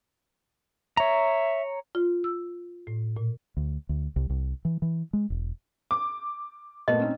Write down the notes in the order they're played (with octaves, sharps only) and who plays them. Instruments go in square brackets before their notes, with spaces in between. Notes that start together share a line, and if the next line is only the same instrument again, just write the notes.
[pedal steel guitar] C#5 A#5 [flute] E5
[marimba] F4
E6
A2
A#2
[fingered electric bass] D2
D2
C2
C2
E3
E3
G#3
E1
[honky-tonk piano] D6
[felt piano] A#2 A3 B3 [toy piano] D#5
[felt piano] C4 C#4 D#4